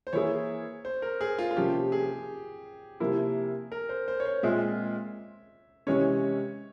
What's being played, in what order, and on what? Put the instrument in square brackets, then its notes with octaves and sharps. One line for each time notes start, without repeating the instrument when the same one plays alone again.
[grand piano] C5
[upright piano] E3 A#3 E4 G#4 [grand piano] C#5
[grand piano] C5
A#4
G#4
F4
F4
[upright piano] C3 F3 A#3 C#4 [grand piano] G4
[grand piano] G#4
[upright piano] C3 F3 A#3 E4
[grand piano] A#4
C5
C5
C#5
C5
[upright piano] A#2 G#3 C4 F4 G#4 [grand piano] E5
[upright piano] C3 E3 G#3 C#4 [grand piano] C#5